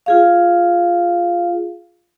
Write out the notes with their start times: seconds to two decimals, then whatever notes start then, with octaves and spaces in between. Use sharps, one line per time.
0.06 F4 G#4 F5